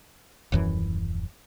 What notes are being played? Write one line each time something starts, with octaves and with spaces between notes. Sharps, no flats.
D#1 F#2 E3